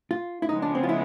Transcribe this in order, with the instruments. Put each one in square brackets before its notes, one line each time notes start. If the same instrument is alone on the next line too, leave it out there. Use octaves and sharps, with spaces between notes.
[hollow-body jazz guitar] F4
E4
[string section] C#3 F3 G#3 B3 [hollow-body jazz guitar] D#4
[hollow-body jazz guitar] D4
C4
F4
E4